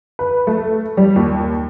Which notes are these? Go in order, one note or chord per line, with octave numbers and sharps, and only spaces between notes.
B4
A3
G3
D#2